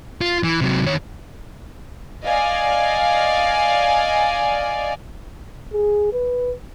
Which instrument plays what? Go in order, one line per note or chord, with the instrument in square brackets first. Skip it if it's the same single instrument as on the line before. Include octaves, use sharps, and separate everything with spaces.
[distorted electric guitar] F4
E3
C3 F#3
D#3 C#5
[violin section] D5 D#5 F5 G#5
[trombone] G#4
B4